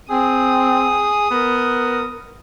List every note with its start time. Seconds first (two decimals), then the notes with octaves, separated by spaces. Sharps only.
0.10 C4 G#4 D#6
1.31 B3 A#4